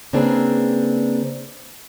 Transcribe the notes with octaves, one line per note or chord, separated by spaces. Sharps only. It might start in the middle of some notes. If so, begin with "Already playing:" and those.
C#3 A#3 C4 D4 G#4 B4